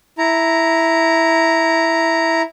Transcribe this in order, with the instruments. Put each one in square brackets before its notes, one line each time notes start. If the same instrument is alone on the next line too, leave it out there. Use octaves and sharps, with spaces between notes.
[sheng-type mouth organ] E4 A#5